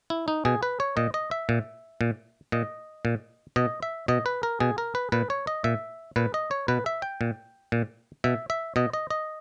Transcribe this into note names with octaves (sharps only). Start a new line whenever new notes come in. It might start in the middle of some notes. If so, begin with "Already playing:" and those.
E4
D#4
B2 G#4
B4
C#5
A#2 D#5
D#5
E5
A#2
A#2
A#2 D#5
A#2
B2 D#5
E5
B2 D#5
B4
A#4
B2 G#4
A#4
B4
A#2 B4
C#5
D#5
A#2 E5
A#2 B4
D#5
C#5
B2 B4
E5
G5
A#2
A#2
B2 E5
E5
B2 D#5
D#5
D#5